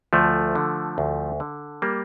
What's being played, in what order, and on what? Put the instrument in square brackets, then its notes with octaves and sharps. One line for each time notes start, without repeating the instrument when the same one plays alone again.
[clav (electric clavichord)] D2 F3 A3
D3
D2
D3
G3 A#3